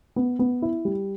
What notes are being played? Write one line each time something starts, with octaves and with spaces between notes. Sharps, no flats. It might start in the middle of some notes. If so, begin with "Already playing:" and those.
B3
B3
E4
G3